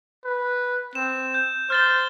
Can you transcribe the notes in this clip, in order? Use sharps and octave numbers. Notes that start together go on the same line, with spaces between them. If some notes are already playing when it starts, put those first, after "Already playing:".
B4
C4 E7
G6
C5 F6 A6 G7